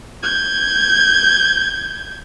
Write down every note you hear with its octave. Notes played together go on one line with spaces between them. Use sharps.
G6 G#6